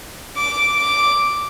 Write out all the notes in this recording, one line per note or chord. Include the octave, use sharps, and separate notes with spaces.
D6
D6